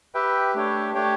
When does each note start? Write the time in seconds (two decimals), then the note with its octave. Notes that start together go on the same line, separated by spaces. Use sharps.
0.14 G4 B4 E5 G5
0.55 A3 D4 G4 C#5 G5
0.94 A3 D4 G4 C#5 G5